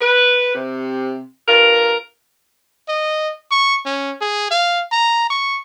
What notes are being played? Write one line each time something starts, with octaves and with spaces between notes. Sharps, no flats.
B4
C3
G2 F4 A#4
D#5
C#6
C#4
G#4
F5
A#5
C#6